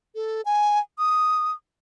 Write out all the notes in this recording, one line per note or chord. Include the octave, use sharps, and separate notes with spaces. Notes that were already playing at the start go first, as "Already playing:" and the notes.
A4
G#5
D#6